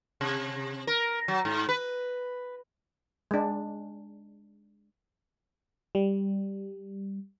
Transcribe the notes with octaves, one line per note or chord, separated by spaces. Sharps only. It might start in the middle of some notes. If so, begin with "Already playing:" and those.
C3
A#4
F#3
G#2
B4
G#3 D4
G3